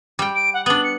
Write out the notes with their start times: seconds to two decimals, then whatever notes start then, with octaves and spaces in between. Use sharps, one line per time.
0.19 G3 G5
0.35 D7
0.54 F#5
0.66 B3 D4 F#7
0.84 C#7